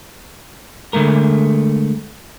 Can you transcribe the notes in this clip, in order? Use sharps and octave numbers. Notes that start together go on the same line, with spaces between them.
D3 G#3 A3 A#4